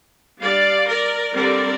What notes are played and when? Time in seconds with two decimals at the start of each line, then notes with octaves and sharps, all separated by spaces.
0.41 G3 D4 D5 F5
0.88 A#4 D5
1.36 D3 G3 C4 A#4 D5